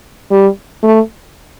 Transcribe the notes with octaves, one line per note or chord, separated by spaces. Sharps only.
G3
A3